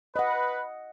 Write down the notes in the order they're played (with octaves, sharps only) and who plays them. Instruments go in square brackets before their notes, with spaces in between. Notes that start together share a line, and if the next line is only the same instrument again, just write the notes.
[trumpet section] B4 [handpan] D#5 F#5